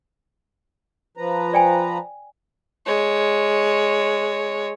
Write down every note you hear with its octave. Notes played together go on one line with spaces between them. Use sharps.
F3 B4 A#5
D5 G5 G#5
G#3 C#5